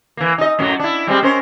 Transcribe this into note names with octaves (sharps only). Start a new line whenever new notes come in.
E3 A#3
D#4 D#5
F#2 A2 F#3
D4 E4
G3 G#3 C4
C#4 A#4 C5